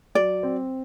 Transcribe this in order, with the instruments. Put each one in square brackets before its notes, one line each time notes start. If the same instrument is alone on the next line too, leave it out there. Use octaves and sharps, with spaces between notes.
[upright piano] F#3 [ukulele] D5
[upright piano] C4